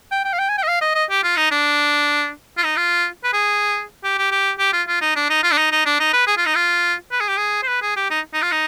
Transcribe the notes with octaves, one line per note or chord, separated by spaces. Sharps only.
G5
G5
F5
G5
G#5
G5
D#5
F5
D#5
D#5
G4
F4
D#4
D4
F4
D#4
F4
B4
G#4
G4
G4
G4
G4
F4
F4
D#4
D4
D#4
F4
D4
D#4
D#4
D4
D#4
B4
G#4
F4
D#4
F4
B4
G#4
G4
G#4
C5
B4
G#4
G4
D#4
D#4
F4
D#4